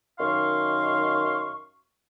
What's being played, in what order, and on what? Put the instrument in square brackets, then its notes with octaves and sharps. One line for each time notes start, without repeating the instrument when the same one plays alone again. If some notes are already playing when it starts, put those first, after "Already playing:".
[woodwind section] F#2 D#3 F5 C6 C#6